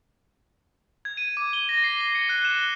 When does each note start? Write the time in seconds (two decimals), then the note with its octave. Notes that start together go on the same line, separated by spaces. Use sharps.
1.05 G#6
1.17 D#7
1.37 D6
1.53 G7
1.69 A#6
1.84 C7
2.01 G7
2.15 C#7
2.29 F#6
2.45 E7
2.58 G7